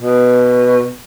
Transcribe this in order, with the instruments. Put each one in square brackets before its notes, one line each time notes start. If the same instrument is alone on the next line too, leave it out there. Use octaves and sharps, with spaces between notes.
[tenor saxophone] B2